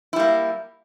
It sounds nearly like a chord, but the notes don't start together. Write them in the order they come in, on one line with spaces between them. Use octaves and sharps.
E4 G3 A#3